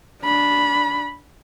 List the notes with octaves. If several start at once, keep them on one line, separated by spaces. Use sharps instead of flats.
D4 B5